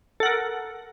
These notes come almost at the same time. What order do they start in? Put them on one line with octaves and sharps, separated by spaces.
A4 F#5 A#4